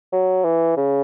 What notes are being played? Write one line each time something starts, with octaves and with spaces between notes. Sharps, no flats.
F#3
E3
C#3